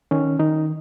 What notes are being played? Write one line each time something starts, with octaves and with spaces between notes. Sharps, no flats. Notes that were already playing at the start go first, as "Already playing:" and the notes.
D#3 C#4
D#3 D#4